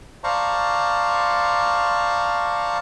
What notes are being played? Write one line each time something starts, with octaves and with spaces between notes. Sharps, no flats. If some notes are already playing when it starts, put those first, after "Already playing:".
C5 D5 F5 A5 A#5 C#6